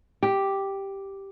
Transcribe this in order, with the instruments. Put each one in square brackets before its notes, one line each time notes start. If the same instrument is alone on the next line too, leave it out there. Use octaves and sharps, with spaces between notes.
[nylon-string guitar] G4